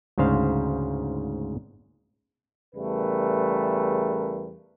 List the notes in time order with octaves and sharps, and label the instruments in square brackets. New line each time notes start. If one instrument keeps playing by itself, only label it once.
[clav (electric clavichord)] D2 G#2 C#3 C5 F5
[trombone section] E2 C#3 G3 A3 A#4 B4